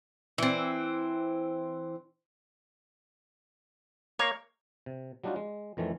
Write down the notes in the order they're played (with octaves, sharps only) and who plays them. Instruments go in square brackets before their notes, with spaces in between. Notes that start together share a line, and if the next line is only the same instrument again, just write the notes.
[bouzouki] E3 C4
[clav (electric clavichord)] A#3 [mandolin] C#5
[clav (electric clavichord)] C3
F#3 G3 D4 D#4 F4 F#4
G#3
F2 D#3 E3 A3 C#4